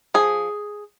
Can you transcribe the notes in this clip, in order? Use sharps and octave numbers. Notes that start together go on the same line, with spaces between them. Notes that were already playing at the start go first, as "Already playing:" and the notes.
F3 G#4